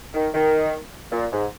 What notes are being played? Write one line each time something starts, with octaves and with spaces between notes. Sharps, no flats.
D#3
D#3
A#2
G#2